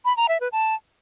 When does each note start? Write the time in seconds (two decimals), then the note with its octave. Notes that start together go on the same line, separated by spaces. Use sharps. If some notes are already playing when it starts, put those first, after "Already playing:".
0.05 B5
0.17 A#5
0.29 E5
0.40 B4
0.52 A5